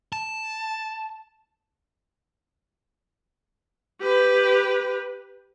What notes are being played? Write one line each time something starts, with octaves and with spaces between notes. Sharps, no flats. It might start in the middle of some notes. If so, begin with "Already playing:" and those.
A5
G4 B4